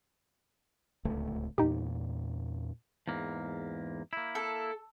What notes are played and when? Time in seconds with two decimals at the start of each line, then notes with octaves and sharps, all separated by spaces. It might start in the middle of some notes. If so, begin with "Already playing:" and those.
1.05 D1 C#2 A3
1.58 E2 A#2 D#4 G4
3.08 E2 G#2 A#3
4.13 A#3 E4
4.35 A4